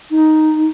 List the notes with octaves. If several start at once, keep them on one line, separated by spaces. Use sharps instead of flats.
D#4